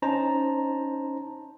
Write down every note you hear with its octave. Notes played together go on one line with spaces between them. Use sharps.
C#4 D#4 C5 A5 A#5